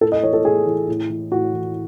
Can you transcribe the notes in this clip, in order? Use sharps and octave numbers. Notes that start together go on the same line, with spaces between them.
A2 A4
D#5
E3 C#5
A4
A2 G#4
E3
A2
E3
A2 F#4
E3